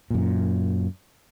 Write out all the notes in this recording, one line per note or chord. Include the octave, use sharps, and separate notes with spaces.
F#2 A#2